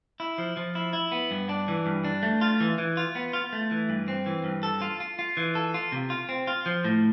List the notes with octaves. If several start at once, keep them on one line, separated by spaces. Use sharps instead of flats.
E4
F3
F3
E4
E4
B3
G2
D4
E3
G2
D4
A3
F4
E3
E3
F4
B3
F4
A3
E3
G2
C4
E3
G2
A4
F4
F4
F4
E3
A4
F4
C3
F4
C4
F4
F3
A2